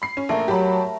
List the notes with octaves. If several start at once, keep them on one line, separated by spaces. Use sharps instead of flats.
B5 C7
C#4
A#1 A3 A#4
F#3 G4 A5 B5